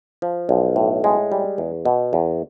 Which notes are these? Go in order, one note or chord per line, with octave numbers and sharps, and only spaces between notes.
F3
B1
A2
G#3
G3
E2
B2
E2